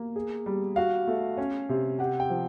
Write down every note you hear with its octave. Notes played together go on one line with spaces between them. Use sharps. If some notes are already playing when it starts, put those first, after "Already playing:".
Already playing: A#3
G#4
G3
F#4 F5
A3
C#4
C3
G4 F#5
G5
F3